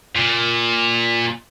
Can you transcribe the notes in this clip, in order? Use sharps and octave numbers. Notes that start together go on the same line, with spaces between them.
A#2